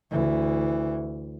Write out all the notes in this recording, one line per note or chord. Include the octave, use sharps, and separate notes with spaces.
D2 E3